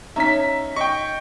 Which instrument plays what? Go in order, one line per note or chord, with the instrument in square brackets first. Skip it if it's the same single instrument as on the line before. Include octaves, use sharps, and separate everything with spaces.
[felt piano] C#4 D#4 A#5 [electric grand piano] E5 B6
[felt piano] D#5 [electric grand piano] G5 C#6